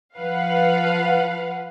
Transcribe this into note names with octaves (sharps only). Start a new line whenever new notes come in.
F3 B4 F5 F#5